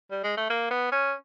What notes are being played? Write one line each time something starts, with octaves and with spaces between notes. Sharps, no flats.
G3
G#3
A3
A#3
B3
C#4